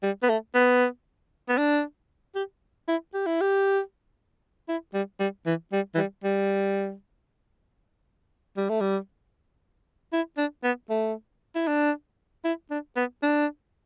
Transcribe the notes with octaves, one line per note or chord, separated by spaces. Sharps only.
G3
B3
A3
B3
B3
D4
G4
E4
G4
E4
G4
E4
G3
G3
E3
G3
E3
G3
G3
G3
A3
G3
E4
D4
B3
A3
E4
D4
E4
D4
B3
D4